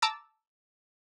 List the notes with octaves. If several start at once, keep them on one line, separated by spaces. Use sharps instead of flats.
A5 A#5 D6 E6 A6